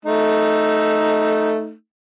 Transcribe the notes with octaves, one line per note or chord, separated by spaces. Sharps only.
A3 D#4